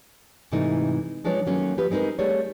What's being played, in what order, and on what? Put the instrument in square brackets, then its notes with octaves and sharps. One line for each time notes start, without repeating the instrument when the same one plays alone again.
[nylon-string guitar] G#2 C3 E3 A3 D#4
F3 G#3 D4 F4 B4 C#5
D#3 F#3 A3 A#3 C#4
F3 G4 B4
G#3 C4 D#4 A#4 B4
G3 A3 G#4 C#5